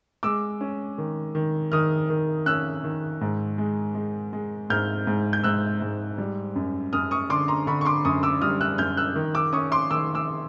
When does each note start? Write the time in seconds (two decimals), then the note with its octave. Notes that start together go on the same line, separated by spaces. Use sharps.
0.23 G#3 D6 E6
0.61 C#4
0.98 D#3
1.35 D#3
1.72 D#3 D#6 F6
2.10 D#3
2.46 C#4 E6 F#6
2.84 D#3
3.21 G#2
3.58 G#3
3.95 G#3
4.33 G#3
4.70 G#2 F6 G6
5.07 G#2
5.33 G6
5.44 G#2 E6 F#6
5.82 G#2
6.18 G3
6.56 F#2
6.93 F#2 D#6 F6
7.11 C#6 D#6
7.30 D3 C6 D6
7.48 A#5 C6
7.67 D3 B5 C#6
7.81 C#6
7.85 C6 D6
8.05 F#2 C#6 D#6
8.23 D6 E6
8.42 G3 D#6 F6
8.61 E6 F#6
8.78 F#2 F6 G6
8.97 E6 F#6
9.16 D#3
9.34 D6 E6
9.53 C#4 C#6 D#6
9.72 C6 D6
9.90 D#3 D6 E6
10.15 D6 E6